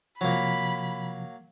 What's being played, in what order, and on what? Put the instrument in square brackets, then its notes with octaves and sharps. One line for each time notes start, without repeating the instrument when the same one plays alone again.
[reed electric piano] C3 F3 [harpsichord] F#3 A#3 [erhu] B5